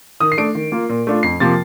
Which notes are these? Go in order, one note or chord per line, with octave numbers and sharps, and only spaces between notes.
D#3 D#6
C7
A3 D4 D7
D#3
A#3 F4
A#2
A3 D4 F4
F2 C7
C3 F3 A#3 F4 A6